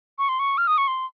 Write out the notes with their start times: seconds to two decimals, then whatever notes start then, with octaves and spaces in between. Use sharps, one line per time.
0.19 C#6
0.29 C6
0.39 C#6
0.58 F6
0.67 D#6
0.78 C#6
0.88 C6